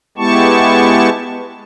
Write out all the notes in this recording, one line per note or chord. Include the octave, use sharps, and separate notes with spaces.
G#3 B3 E4 G4 A5 C#6